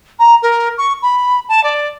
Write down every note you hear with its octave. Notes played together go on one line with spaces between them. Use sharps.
A#5
A#4
C#6
B5
A5
D5